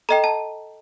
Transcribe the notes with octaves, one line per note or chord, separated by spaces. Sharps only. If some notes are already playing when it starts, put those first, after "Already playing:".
A4 D#5 G5 A#5
A5